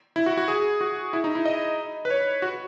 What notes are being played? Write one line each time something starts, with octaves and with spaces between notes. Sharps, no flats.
E4
F#4
F#4
G#4
F#4
E4
D#4
E4
D#5
B4
C#5
F#4